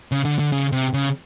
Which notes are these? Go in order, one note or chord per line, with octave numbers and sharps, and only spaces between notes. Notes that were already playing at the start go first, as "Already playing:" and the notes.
C#3
D3
D3
C#3
C3
C#3